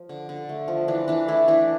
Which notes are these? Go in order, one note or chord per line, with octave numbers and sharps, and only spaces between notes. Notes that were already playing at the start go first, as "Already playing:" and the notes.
Already playing: F3
D3
D3
A3
F3
E3 D4
E3 D4
A3 E4
E3 D4